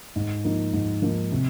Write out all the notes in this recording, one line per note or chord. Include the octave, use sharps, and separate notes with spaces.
G#2
F3 A#3 D#4
G#2
F3 A#3 D#4
C3